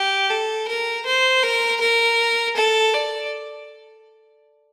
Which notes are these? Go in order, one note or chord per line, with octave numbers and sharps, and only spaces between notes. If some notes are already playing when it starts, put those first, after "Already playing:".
Already playing: G4
A4
A#4
C5
A#4
A#4
A4
D5